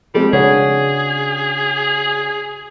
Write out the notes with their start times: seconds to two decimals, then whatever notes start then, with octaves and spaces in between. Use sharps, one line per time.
0.14 F3 G3 G#3 C4
0.33 C#3 D4 F#4 G#4 C#5